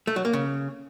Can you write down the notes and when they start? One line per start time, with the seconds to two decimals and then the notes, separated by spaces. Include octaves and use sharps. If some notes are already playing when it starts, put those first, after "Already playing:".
0.07 A3
0.16 F#3
0.25 A#3
0.33 C#3